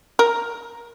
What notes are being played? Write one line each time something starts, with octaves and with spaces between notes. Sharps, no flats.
A#4